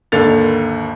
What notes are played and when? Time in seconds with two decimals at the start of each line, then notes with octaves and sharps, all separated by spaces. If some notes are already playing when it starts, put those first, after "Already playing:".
0.12 G#1 D#2 D3 A#3 A6 F7